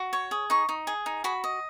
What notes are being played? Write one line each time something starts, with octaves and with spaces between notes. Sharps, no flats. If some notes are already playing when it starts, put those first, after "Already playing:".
Already playing: F#4
C#5
G#4
D#4 C#6
D#4
G#4
D#4
F#4 B5
D#5